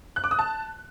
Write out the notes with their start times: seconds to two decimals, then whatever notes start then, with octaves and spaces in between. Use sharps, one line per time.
0.16 F#6
0.24 D6
0.31 D#6
0.39 A5